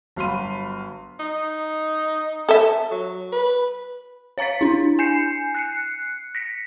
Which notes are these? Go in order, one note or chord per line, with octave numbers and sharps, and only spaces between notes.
G1 F#3 F5 B5 C6 D#7
D#4
A4 E5
F#3
B4
C#5 F5 A#5 A6 B6
D4 E4
G#5 G6 C7 C#7
F#6 C7 C#7
A#6 B6 C#7